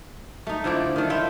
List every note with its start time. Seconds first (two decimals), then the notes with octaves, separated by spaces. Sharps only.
0.47 A3 D#4
0.64 D3 F3 E4 D5
0.96 D#3 A3
1.10 E4 F4 E5 G5